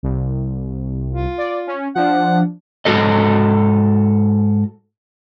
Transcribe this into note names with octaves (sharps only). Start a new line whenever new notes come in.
C2
F4
D5
C#4
F3 D4 F#5
G#2 F#4 A4 D#5